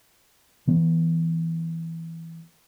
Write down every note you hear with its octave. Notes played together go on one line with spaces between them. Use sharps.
E3 B3